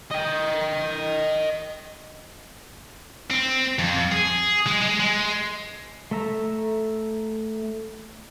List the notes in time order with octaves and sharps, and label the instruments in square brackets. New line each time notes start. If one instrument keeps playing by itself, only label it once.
[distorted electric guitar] D#5 G5
C4
F2
G#4
G#3
G#3
G#3
[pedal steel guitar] A3 A4 E5 A#5